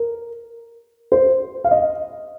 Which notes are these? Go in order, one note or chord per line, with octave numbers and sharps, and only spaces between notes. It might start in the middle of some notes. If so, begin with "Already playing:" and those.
Already playing: A#4
C5
F5
D#5